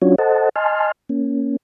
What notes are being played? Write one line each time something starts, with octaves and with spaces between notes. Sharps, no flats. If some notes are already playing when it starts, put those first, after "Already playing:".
F#3 C#4 D4 F4 F#4 C#5
A4 C5 D#5 F#5 A5
D#5 G#5 A5 C6 F6
A#3 C#4